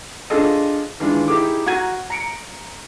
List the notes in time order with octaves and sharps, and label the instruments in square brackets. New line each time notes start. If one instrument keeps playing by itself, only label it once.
[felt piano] D4 F4 G#4 A4 D#5
D#3 E3 G#3 D4 F4
D#4 E4 G4 G#4 D6
F#4 F#5 A#5 G#6 D#7
A#5 C#7 D7